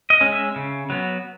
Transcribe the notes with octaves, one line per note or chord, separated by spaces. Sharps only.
D#5
G#3 C#4
E5
C#3
F#3 B3